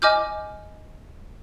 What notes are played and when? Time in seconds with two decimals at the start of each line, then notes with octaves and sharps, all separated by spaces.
0.02 D#5 G#5 D6 F6 G6